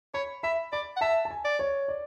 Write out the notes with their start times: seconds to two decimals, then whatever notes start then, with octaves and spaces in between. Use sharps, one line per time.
0.14 C#5 B5
0.43 E5 B5
0.72 D5 B5
0.96 F#5
1.01 E5 A5
1.25 A5
1.31 G#5
1.45 D5
1.59 C#5
1.88 D5